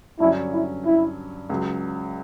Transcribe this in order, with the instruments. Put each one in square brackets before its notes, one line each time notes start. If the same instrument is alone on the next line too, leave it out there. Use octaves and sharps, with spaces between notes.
[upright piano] G2 D3 F#3 C#4 [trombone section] E4
[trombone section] E4
E4
[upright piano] C#2 C#3 F#3